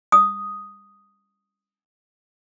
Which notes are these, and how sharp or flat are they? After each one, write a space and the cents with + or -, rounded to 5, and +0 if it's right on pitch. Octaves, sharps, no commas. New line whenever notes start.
D#6 +0